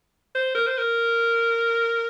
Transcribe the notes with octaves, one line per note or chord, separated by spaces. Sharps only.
C5
A#4
C5
A#4